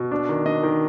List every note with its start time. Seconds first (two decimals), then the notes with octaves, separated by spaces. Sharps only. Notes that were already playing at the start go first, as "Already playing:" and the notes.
Already playing: B2
0.12 D4
0.29 D#3
0.46 D4 D#5
0.63 D#3